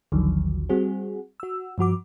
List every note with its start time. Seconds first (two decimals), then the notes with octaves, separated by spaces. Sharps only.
0.12 A1 D#2 D3 D#3 F3 F#3
0.69 G3 C4 F#4 G#4
1.40 F#4 E6
1.78 G2 F3 F#4 D6